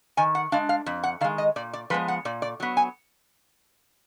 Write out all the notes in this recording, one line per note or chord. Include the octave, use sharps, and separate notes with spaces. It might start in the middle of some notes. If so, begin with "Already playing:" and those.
D#3 G#5
F#5
G#3 D4 F5
F5
F2
F#5
D#3 G#3 F5
D#5
A#2 D5
D5
F3 G#3 B3 B4
F#5
A#2 D5
D5
F#3 B3
G#5